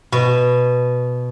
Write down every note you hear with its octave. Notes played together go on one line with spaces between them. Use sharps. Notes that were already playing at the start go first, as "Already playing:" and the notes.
B2